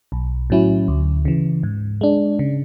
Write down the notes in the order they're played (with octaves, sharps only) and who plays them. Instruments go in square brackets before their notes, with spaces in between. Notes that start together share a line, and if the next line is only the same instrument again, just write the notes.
[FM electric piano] B1
A2 F#3 C#4 E4
D2
C#3 E3
G#2
G#3 D4
C#3